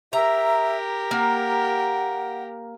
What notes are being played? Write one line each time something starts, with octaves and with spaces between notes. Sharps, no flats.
G4 A#4 E5 A#5
A#3 F#5